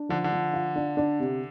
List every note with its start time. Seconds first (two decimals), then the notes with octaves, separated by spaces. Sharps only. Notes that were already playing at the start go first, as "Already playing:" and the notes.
Already playing: D4
0.09 D3 F3
0.24 D3
0.32 F3
0.53 F4
0.76 D4
0.97 D4
1.20 C3